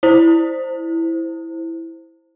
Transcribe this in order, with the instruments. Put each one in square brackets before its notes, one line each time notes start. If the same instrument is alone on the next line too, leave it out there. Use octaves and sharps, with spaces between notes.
[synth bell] E4 C5